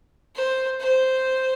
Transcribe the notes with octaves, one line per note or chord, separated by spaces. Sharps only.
C5
C5